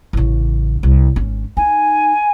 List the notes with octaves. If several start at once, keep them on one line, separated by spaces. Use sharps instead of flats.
A1 C#3
C2
G#1 C#4
D#4 G#5